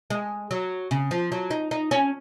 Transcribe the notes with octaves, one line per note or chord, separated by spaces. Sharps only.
G#3
F#3
C#3
F3
F#3
D#4
D#4
C#4